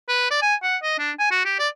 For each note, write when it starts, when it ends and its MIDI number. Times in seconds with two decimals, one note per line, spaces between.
0.09 0.28 71
0.31 0.38 74
0.42 0.55 80
0.63 0.77 78
0.83 0.97 75
0.99 1.12 62
1.19 1.31 80
1.31 1.45 66
1.45 1.58 67
1.59 1.68 74